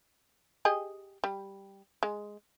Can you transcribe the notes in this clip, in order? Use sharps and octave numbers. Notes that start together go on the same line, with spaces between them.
G4 G#4 D#5
G3
G#3